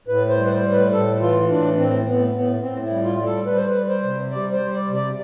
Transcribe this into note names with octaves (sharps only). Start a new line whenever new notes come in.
A2 B4
C5
G3
B4
C5
A2
B4
A2 A4
E3 F4
A2 D4
A2 C4
A2 B3
A2 B3
A2 C4
E4
G3
F4
G3
A4
G3 B4
C5
B4
G3
C5
C3
G3 D5
C5
G3
D5
C3
D5